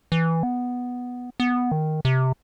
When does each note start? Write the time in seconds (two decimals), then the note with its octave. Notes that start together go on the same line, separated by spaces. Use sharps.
0.12 E3
0.43 B3
1.40 B3
1.72 D#3
2.05 C3